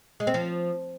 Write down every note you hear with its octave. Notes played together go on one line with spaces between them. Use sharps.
G#3
C4
F3